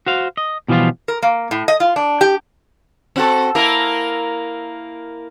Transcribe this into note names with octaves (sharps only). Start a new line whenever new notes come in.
F#4 C5 F5
D#5
B2 E3 F3 G3 F4
A#4
A#3
A2
D#5
F4
D4
G4
C4 F#4 A4
A#3 E4 A#4